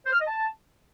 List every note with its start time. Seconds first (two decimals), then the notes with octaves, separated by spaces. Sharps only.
0.05 C5
0.13 F6
0.20 D#5
0.27 A5